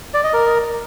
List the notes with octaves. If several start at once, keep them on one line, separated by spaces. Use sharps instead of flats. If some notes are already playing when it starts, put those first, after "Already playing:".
D5
D#5
A#4